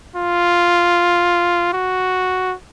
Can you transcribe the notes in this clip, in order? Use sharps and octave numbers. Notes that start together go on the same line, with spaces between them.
F4
F#4